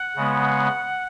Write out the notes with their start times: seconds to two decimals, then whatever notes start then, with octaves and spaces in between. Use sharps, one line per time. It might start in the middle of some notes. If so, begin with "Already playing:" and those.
Already playing: F#5
0.16 C#3 G#3 B3